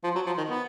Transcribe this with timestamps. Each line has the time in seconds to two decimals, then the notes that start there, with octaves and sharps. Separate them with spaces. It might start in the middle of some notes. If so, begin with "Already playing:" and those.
0.04 F3
0.15 F#3
0.26 F3
0.37 D#3
0.49 B3